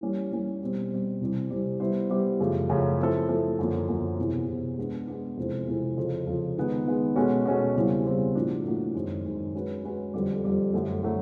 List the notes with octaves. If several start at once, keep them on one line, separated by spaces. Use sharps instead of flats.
E3 G3 A#3 C#4
E3 G3 A#3 C#4
B2 G3 C4
B2 G3 C4
C3 E3 G3 C4
C3 E3 G3 C4
G3 B3 E4 G4 C5
G3 B3 E4 G4 C5
F#2 C#3 F3 A3
F#2 C#3 F3 A3
F3 A3 C4 E4 A4
F3 A3 C4 E4 A4
F#2 D3 F3 A#3
F#2 D3 F3 A#3
E2 C3 E3
E2 C3 E3
G#3 B3 D4
G#3 B3 D4
F2 C3 E3 G#3 C4
F2 C3 E3 G#3 C4
F2 C#3 F3
F2 C#3 F3
D#3 G#3 B3
D#3 G#3 B3
B2 G#3 C#4 F#4 A4
B2 G#3 C#4 F#4 A4
E2 C#3 E3 G3 C4
E2 C#3 E3 G3 C4
A2 F3 A#3 D4 F#4
A2 F3 A#3 D4 F#4
F#2 D#3 G#3 C4
F#2 D#3 G#3 C4
G#3 C#4 F#4 B4
G#3 C#4 F#4 B4
F2 D3 G3
F2 D3 G3
F#2 D3 F#3 A3
D3 F#3 A3